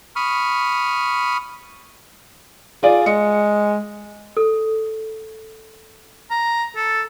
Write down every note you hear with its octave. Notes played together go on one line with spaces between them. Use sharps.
B5 C#6 D#6 F6
F4 G#4 D5
G#3 C#7
A4
A#5
A4